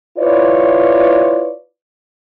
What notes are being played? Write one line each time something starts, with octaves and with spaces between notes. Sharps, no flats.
E4 F4 B4 C#5 D5